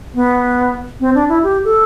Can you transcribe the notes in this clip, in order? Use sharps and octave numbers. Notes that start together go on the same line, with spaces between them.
B3
C4
D4
E4
G4
A4